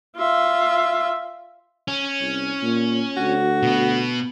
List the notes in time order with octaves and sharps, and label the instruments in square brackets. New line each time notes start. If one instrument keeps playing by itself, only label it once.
[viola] F4 E5
[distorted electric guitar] C#4
[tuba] C2
A#2
[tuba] D2 [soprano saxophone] F#4
[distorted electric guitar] B2 B3